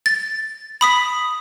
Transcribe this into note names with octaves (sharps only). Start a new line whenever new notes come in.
A6
B5 D#6 B6